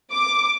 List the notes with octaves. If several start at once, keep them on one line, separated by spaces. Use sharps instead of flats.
D6